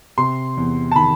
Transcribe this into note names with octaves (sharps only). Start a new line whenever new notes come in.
C3 C6
E2
A5
D#3 B5